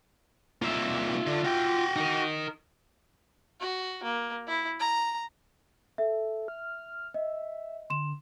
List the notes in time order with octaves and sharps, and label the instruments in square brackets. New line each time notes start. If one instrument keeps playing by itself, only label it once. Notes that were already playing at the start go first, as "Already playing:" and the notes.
[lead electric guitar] C2 A#3 [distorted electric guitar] F4 E5
[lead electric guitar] D3
F#4 G5
[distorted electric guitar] D#4 A#4
[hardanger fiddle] F#4
A#3
E4
A#5
[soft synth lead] A4 [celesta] E5
[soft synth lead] F6
[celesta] D#5 [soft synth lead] E5
[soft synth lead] D3 [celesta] C6 E7